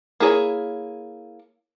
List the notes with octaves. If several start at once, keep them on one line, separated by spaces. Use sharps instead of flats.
A#3 E4 G#4 A4 C#5